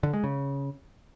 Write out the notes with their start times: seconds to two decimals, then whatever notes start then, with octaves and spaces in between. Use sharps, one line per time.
0.03 D3
0.13 G#3
0.24 C#3